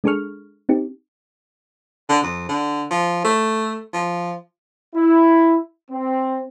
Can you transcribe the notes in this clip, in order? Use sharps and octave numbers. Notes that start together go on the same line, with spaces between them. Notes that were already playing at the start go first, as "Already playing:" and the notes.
G#3 D4 G#4 A4 C#6 F6
C4 D#4 G4
D3
F2
D3
F3
A3
F3
E4
C4